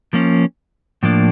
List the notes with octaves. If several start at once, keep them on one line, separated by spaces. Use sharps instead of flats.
F3 A#3 C#4
A2 F3 A#3 D4